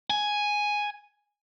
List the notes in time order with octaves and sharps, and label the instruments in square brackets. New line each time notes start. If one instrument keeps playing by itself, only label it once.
[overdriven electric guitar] G#5